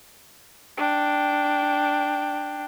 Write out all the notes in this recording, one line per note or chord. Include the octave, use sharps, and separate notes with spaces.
D4 G5